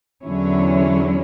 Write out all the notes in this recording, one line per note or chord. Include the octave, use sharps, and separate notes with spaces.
E2 D3 F#3 C#4 E4